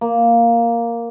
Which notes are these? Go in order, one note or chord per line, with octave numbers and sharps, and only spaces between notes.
A#3